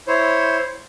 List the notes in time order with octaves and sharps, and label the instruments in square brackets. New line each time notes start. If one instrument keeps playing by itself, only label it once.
[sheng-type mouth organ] E4 C5 C#5